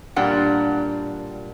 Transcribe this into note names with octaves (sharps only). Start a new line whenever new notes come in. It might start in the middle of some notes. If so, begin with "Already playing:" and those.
A#2 G3 D4 A#4 F#5 G5